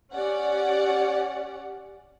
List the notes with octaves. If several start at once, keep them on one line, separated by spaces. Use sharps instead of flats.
C#4 G4 D5 F#5